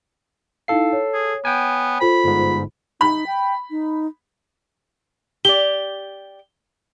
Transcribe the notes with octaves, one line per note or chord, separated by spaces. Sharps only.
D#4 E4 A4 F5 C7
C#5
G#4
B3 G5 G#5
F4 A4 C5 B5
G1 G#2
D#4 B5
G5
D#4
G4 D5 G7